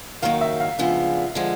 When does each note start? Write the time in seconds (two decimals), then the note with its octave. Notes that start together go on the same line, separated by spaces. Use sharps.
0.22 F#2 D#3 F#3 A#3 D#4 F5
0.41 E5
0.60 F5
0.79 C#3 F3 G#3 B3 D4
1.35 D3 F3 G#3